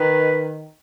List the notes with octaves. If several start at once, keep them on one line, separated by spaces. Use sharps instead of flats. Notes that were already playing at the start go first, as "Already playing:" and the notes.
Already playing: D#3 B4